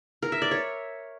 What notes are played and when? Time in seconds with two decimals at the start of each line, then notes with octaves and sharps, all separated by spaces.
0.22 A#4
0.32 E5
0.42 D5
0.51 C#5